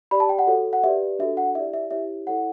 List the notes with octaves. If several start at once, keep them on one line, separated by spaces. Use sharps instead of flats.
G4 D5 B5
A5
G5
F#5
F#4 A4 C#5
F#5
G4 B4 D5 E5
D4 F#4 A4 E5
F#5
E4 G4 D5 E5
E5
E4 G4 C#5 E5
E4 A4 C#5 F#5